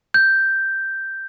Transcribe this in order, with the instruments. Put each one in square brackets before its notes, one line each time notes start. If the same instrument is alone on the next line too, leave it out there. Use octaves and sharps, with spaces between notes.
[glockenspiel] G6